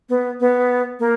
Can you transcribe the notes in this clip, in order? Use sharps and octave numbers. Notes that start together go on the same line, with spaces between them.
B3
B3
A#3